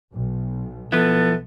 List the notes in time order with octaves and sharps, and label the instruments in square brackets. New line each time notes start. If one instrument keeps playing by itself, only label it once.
[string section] B1
[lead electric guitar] F3 E4 [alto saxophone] B3 [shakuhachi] A4